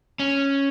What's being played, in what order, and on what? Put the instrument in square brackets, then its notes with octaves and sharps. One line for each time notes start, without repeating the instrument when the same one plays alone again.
[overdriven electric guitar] C#4